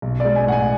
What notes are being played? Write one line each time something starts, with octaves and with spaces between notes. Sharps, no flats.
B1
G#3 D5
G#5
A2 F#5
G#5